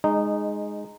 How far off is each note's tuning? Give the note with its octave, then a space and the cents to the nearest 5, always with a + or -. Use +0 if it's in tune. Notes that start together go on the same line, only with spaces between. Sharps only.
G#3 +0 D#4 -15